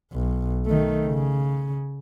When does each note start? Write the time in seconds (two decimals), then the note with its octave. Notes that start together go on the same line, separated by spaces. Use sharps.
0.13 B1
0.66 D#3 A3
1.07 C#3